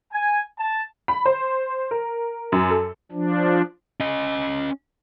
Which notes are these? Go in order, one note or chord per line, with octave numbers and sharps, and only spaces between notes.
G#5
A5
B5
C5
A#4
F#2
A4
F3 D4
C#4 D#5